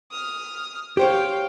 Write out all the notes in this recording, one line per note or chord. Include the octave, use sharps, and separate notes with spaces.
D#6 F6
G4 C5 C#5 F5 G5